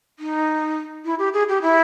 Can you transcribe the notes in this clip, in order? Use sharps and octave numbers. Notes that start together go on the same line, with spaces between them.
D#4
E4
G4
G#4
G4
E4